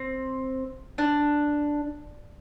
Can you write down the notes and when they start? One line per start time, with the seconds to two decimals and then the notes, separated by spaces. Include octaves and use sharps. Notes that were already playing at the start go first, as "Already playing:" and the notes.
Already playing: C4
0.98 D4